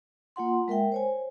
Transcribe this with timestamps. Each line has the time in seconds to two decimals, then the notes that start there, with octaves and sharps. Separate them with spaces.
0.36 A#3 F4 F#5 C6
0.68 G#3 A#4 E5 G5
0.92 C5 C#5 G#5